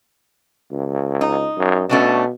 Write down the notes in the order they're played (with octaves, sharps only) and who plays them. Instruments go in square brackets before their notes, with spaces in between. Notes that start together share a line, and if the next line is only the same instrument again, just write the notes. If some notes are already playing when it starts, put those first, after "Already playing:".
[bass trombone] C#2
[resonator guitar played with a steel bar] D#4
[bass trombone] F#2
[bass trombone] B2 [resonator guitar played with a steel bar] A3 C#4 D4